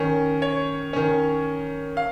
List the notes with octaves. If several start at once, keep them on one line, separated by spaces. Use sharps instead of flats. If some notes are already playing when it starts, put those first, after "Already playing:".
Already playing: D#3 C#4
C#5
D#3 C#4
F5